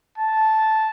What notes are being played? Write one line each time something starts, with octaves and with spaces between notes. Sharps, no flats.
A5